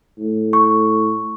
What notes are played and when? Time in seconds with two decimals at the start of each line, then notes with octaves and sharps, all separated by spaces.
0.18 A2
0.53 C#6